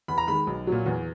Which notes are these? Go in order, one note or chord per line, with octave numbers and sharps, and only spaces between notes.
E2 B5
A#5
D#3 G#3 B5
B1
A#2 F#3
E2